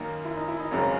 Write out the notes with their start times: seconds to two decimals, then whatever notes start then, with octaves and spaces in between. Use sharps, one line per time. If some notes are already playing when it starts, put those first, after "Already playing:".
Already playing: F#2 D#3 A#3 D#4
0.24 E4
0.37 D#4
0.48 E4
0.60 D#4
0.71 G#1 F#2 C#3 F#3